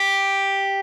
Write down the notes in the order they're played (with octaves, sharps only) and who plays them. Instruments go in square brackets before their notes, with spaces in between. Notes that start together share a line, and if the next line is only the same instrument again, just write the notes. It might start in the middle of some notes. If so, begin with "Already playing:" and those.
Already playing: [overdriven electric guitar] G4